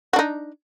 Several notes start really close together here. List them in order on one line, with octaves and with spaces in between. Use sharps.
F#4 D4 D#4